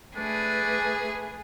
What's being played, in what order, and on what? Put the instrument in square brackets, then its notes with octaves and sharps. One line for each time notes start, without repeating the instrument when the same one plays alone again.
[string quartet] A3 G#4 B4 [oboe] D4